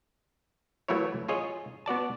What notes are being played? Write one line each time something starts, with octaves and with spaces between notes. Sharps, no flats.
E3 F#3 A3 A#3 E4 C#5
F4 G#4 C#5 D#5
B3 F#4 D5 A5